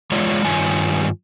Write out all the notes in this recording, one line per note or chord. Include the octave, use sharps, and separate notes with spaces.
E2 G#3 F4 C#5 D5
G2 D#3 F4 C#5 G#5